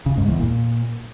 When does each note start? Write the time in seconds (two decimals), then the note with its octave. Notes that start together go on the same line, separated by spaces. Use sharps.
0.06 C#3
0.17 G#2
0.28 E2
0.39 A#2